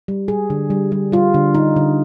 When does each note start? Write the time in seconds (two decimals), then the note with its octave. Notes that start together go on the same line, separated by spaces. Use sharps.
0.08 G3
0.28 G3 G#4
0.50 D3
0.70 G3
0.92 G3
1.12 G3 F4
1.34 D3
1.55 D3 D#4
1.76 D3